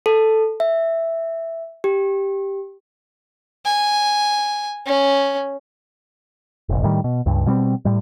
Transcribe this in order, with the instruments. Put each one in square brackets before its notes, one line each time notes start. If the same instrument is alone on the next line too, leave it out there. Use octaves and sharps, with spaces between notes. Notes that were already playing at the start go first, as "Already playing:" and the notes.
[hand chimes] A4
E5
G4
[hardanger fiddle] G#5
C#4
[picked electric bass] F1 A#1
A2 D#3 G3
B2
C#2 G2
B2 G3 B3 C4
A2 G3